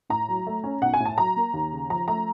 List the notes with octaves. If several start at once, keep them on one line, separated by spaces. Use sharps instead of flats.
A2 A#5
F#3
A3
C#4
B1 F#5
G#5
A2
A5
F#3 A#5
A#3
D#2
C#3
F3 A#5
A3 A#5